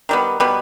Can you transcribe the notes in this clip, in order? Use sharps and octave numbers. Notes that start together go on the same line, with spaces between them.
D#3 G3 B3
B2 G3 B3